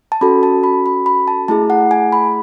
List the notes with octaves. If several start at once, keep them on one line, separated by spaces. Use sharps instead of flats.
A5
C#4 F#4 A4 B5
A5
B5
B5
B5
A5
A3 E4 G#4 A5
F#5
G#5
B5